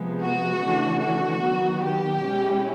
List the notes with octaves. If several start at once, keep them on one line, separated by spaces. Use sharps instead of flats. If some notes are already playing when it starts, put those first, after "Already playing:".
Already playing: C3 F3 G#3 B3
F#4
C#3 E3 A3 D4
F#4
D#3 F#3 B3
G4
B2 G#3 C#4 E4